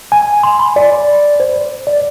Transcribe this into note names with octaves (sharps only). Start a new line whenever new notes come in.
G#5
C6
B5
D5
C5
D5